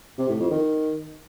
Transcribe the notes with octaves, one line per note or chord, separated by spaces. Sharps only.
C3
A2
F2
D#3